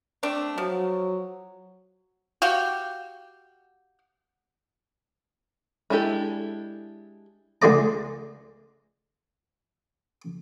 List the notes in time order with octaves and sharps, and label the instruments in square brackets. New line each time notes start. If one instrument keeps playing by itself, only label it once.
[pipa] A3 C4 D4
[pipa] F3 [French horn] F#3
[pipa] F#4 G4 F5 G5
[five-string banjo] G#3 D4 E4 G4 A4
[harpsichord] C#2 D3 G#3 A3 D5 A#5